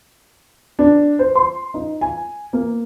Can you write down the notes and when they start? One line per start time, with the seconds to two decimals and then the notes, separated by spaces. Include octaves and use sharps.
0.79 D4
1.19 C5
1.35 C6
1.74 D#4
2.01 G#5
2.53 A#3